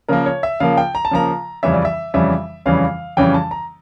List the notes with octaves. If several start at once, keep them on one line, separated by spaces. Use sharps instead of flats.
C#3 F3 A#3 A#4
C#5
E5
C#3 F3 A#3 F5
G5
A#5
A5
C#3 F3 A#3 A#5
F2 C#3 E3 G3 C#4 E5
D5
E5
F2 C#3 E3 G3 C#4 E5
F2 C#3 E3 G3 C#4 F5
F2 C#3 E3 G3 C#4 G5
A5
A#5